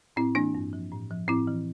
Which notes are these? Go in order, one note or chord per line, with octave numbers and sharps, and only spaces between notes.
A2 C4 E4
E3 A#3 D4
G2
F3
A2
F3
A2 C4 E4
E3